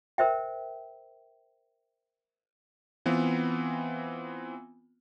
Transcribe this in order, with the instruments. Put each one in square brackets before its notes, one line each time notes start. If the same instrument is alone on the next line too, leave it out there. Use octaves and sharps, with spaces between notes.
[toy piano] A#4 C5 E5 G5
[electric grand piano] E3 B3 C4 F4